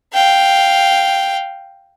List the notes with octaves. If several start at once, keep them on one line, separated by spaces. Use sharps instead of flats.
F5 G5